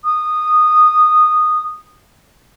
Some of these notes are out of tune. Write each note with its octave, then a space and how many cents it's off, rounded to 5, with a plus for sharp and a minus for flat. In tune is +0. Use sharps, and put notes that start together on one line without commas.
D#6 -15